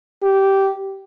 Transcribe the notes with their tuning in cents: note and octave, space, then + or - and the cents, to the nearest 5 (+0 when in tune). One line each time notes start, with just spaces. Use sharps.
G4 -15